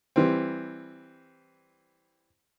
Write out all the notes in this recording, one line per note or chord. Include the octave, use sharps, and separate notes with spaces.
E3 G3 C4